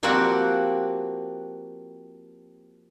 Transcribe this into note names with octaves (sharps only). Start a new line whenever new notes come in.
F3 A#3 C4 F#4 G4 F#5